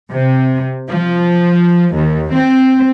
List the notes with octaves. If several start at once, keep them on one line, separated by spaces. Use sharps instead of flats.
C3
F3
D#2
C4